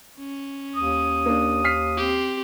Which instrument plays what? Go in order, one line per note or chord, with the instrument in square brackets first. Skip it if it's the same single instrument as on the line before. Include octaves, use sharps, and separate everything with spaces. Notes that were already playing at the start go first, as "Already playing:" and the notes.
[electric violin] C#4
[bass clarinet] D#2 [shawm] D#6
[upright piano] A#3 D4
F6 B6 C7
[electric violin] C4 G4